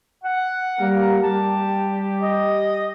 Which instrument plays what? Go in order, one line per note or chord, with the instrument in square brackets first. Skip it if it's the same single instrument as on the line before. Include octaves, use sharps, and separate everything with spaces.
[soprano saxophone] F#5
[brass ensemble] G3 A#3 A#4
[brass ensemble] G3 G4 [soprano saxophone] A5
[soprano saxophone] D#5